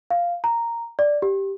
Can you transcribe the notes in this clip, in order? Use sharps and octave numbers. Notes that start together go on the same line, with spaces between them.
F5
A#5
D5
G4